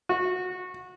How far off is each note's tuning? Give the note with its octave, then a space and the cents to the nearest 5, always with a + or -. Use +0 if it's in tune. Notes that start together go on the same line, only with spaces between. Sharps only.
F#4 -20